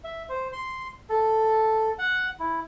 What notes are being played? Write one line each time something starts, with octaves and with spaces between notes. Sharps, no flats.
E5
C5
C6
A4
F#5
E4